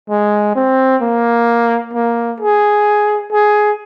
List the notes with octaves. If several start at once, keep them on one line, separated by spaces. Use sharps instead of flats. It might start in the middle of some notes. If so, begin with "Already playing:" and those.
G#3
C4
A#3
A#3
G#4
G#4